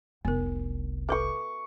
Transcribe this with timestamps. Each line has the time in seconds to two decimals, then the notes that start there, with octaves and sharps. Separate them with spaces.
0.25 F1 C2 B3 A#4
1.09 A4 B4 C#6 D6